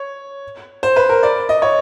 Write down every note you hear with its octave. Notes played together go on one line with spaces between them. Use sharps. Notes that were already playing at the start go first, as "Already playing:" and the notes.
Already playing: C#5
C5
B4
A#4
D5
D#5
C#5